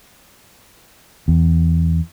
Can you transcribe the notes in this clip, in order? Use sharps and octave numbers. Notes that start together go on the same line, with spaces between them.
E2